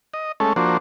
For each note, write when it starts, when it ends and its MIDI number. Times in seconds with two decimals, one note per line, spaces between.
0.14 0.32 75
0.40 0.53 56
0.40 0.53 57
0.40 0.53 61
0.40 0.53 69
0.56 0.77 53
0.56 0.77 58
0.56 0.77 62
0.56 0.77 66
0.56 0.77 72